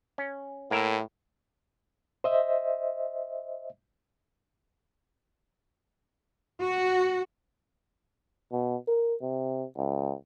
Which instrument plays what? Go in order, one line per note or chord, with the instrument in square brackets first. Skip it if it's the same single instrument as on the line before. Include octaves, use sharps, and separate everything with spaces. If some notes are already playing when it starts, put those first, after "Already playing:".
[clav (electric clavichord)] C#4
[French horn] A2 [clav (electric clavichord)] A#3 A#4 E5
[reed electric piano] C5 D#5 E5
[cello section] F#4
[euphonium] B2
A#4
C3
C#2